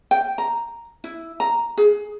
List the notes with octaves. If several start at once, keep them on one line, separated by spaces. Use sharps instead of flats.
G5
A#5
E4
A#5
G#4